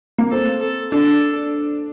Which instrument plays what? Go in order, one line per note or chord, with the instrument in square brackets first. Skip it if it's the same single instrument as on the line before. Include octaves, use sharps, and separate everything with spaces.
[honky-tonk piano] A#3
[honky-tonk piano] C4 [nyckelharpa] A4
[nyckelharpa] A4
[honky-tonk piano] D4 [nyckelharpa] A4